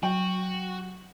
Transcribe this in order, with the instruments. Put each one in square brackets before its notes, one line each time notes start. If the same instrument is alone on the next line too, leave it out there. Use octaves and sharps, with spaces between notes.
[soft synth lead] F#3 [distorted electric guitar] F#4 [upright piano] G5